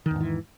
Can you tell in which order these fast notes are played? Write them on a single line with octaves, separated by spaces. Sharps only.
D#3 E2 G#2 E3